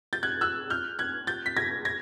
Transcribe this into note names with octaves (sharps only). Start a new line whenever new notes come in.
G6 A6
F#6 G#6
E6 F#6
F6 G6
F#6 G#6
G6 A6
B6
G#6 A#6
G#6 A#6